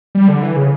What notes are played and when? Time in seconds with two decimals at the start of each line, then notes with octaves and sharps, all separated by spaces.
0.15 G3
0.28 D3
0.43 E3
0.56 C#3